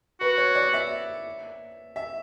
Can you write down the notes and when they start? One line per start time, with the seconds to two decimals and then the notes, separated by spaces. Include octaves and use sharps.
0.20 F#4 B4
0.38 C#5
0.55 D5
0.73 E5
1.96 E5